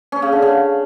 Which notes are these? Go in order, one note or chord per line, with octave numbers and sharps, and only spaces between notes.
C#4
C#3
D3
C#3